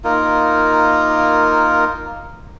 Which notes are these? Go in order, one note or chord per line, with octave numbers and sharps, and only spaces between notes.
A#3 D#4 F4 A#4